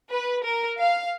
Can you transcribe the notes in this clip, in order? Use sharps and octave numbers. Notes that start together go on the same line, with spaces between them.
B4
A#4
F5